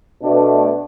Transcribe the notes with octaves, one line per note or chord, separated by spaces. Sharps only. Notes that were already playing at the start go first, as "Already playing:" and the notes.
B2 A3 D4